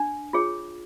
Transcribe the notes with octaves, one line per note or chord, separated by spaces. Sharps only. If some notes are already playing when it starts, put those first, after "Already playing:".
Already playing: D4
F4 G#4 C#5